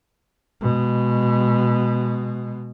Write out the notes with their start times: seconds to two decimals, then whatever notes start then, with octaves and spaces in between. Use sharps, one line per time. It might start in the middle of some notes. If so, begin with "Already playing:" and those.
0.61 B2 G#3